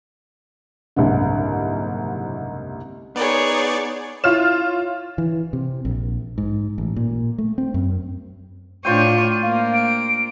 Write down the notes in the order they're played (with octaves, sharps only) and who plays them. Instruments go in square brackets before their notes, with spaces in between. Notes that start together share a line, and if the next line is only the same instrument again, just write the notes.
[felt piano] F#1 C2 G#2 D3
[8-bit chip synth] B3 D5 [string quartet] D#4 G#4 C#5
[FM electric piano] E4 C#5 [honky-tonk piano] F4 F6 E7
[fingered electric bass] E3
C3
A#1
G#2
A1
A#2
A3
C4
F#2
[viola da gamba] A2 D4 C#5 [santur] F4 C5 G5 [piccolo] D#7
[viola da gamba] A#3 [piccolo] F5
[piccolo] D7